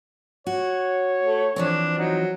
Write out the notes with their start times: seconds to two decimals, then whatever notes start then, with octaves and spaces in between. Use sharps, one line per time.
0.47 F#4 C#5
1.23 A3
1.56 E3 F3 C4 D4
1.98 F#3 D#4